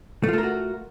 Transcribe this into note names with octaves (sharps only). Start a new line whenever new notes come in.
A3 F4 F#4 A4 A#4